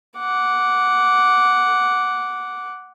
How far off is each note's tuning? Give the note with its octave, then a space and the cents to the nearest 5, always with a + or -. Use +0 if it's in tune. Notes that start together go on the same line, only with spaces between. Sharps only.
F#5 +0 D6 -10